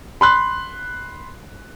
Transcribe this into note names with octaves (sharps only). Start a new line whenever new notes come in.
B5 C6 F#6